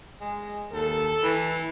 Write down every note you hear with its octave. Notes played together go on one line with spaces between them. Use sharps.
G#3
D#2 A4
E3